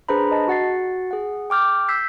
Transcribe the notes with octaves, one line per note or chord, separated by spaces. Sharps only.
D4 G#4 B4 C5 A#5 B5
D#5 A5
F#4 F#5 A6 C7
G#4 F#5
G5 D6 F6 G6
E6 G6 B6 C7